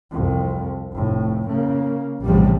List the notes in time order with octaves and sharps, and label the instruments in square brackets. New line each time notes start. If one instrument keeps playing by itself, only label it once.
[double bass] C2 F2
F1 A2
C#3 A#3
[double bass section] A#1 E2 G3 [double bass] A2 C3